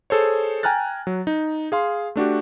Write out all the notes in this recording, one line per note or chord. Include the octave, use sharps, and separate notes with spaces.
G#4 A4 C5 C#5
G5 G#5 A#5 F6 F#6 A6
F#3
D#4
G#4 F5 C6
A3 D4 F#4 G4